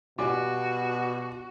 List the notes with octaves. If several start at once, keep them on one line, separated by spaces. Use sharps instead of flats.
B2 G3 F4 F#4 D5 G#5 D6